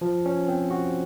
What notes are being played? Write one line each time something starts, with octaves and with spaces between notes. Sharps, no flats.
F3
C#4
C4
F#4